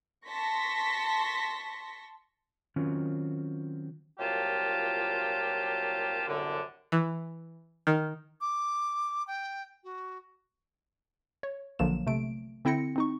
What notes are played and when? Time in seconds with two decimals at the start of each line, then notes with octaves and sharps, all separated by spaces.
0.27 A5 C6 C#6 A#6 B6
2.76 D#3 F#3 C4 C#4 F4
4.19 C2 A#2 F#3 F4 G4 A5
6.28 C2 F#2 A2 D3
6.92 E3
7.87 D#3
8.41 D6
9.27 G5
9.84 F#4
11.43 C#5
11.79 A#1 D3 F3 F#3 A#3 E7
12.07 C3 A3 D7
12.65 D3 C4 E4 G5 A#6 C#7
12.96 C4 D#4 C#6